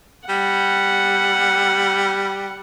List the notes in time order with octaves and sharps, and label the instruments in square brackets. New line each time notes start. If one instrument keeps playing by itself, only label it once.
[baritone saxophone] G3 [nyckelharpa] F#5